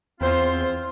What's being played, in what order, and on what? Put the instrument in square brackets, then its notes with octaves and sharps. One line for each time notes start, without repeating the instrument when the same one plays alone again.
[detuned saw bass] E2 [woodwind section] C4 F4 [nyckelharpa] C5